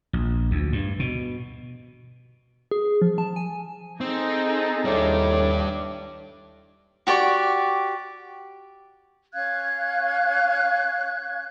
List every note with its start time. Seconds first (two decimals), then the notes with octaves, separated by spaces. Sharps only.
0.13 A#1
0.51 D2
0.73 G2
0.99 B2
2.71 G#4
3.02 F3
3.18 A5
3.36 G#5
4.01 C4 D#4 G#4 A4
4.85 D#2 A2 G3 D4 D6
7.07 F#4 G4 D5 C#6
9.34 C#4 F5 F#6 G#6